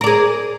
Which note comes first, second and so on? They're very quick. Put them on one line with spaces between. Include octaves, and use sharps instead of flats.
A#4 D5 G#4